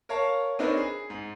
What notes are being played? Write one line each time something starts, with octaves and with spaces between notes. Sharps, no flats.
A#4 C#5 F5 A5
C4 D4 D#4 A#4 B4 C#5
G#4
G#2